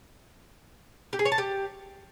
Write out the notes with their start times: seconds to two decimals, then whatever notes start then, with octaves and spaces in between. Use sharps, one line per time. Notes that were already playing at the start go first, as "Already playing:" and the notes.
1.13 G4
1.19 G#4
1.25 C#5
1.32 A5
1.38 G4